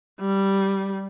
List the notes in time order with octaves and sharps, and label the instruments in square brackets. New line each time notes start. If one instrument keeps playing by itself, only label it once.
[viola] G3